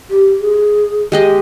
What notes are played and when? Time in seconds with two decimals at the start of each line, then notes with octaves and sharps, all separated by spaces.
0.10 G4
0.40 G#4
1.12 G#3 G4 D#5